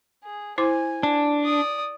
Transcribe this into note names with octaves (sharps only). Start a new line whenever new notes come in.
G#4
E4 C5 G#5 D6
D4
D5 D#6